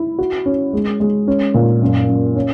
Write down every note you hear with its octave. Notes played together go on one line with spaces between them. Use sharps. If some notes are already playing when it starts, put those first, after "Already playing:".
Already playing: E4
F#4
C#4
G#3
G#3
C#4
A#2
F#2
F#2
C#4